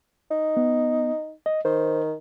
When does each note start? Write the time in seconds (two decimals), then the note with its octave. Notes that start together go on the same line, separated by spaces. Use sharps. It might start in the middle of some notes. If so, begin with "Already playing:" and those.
0.31 D#4
0.57 B3
1.46 D#5
1.65 D#3 C5